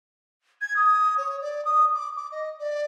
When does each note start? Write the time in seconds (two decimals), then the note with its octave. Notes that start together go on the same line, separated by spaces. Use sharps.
0.61 G#6
0.76 D#6
1.17 C#5
1.41 D5
1.65 D#6
1.94 D6
2.16 D6
2.31 D#5
2.59 D5